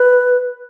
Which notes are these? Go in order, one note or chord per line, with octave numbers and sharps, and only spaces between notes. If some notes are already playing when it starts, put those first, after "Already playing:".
Already playing: B4